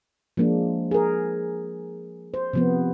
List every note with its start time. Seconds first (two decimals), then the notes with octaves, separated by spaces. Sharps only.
0.37 F3 G#3 A#3 D4
0.91 G#4 A#4
2.34 C5
2.53 C3 F3 B3